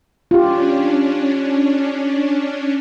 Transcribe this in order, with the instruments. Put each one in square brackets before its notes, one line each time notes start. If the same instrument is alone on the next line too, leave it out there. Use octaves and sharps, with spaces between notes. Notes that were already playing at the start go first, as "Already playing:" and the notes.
[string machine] C#4 D4 [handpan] F4 G4